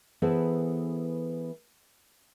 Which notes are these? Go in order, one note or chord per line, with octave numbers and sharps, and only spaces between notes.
E3 B3 E4 G#4 A4 C5